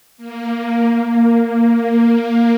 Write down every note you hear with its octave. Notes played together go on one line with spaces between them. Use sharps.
A#3
A#3
A#3